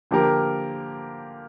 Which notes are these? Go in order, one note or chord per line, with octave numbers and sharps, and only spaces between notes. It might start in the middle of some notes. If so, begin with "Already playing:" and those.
D3 F3 A#3 G4 A#4